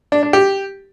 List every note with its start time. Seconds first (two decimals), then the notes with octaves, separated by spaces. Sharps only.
0.12 D4
0.23 D4
0.33 G4